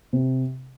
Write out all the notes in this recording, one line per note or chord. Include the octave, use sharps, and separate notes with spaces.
C3